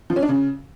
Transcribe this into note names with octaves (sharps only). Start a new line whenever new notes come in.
F3
C#4
D4
C#3